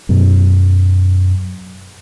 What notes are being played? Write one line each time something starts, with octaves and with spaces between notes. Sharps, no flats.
F#2 B2